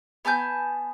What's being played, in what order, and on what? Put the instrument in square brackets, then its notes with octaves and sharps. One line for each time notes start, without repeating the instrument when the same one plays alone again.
[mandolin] B3 G#5 A5 G6